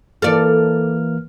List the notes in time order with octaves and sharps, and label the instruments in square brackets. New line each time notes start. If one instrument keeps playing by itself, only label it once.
[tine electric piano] E3 A#3 F6 [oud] A4 D5